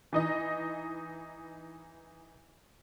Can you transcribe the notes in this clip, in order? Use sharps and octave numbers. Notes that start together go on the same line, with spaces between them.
E3 D#4 D#5